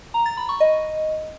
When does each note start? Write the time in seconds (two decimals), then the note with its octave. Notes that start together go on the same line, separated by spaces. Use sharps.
0.14 A#5
0.26 A6
0.37 B5
0.49 C#6
0.60 D#5